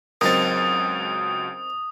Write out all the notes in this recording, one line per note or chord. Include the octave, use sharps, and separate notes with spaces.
C#2 F#3 C4 D#4 A#4 D#6 A6